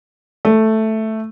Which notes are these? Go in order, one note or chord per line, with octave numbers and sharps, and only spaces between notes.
A3